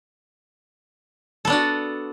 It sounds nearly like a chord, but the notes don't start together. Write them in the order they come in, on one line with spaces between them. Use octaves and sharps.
A4 B3 D4 F#4